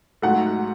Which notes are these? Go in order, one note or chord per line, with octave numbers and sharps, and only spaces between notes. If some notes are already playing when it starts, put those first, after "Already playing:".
G#2 F#3 A3 F#5